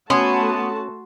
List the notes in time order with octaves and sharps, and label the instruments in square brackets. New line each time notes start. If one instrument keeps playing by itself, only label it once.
[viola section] A3 F#4 A5 [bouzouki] B3 [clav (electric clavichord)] C#4 [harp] C6 G#6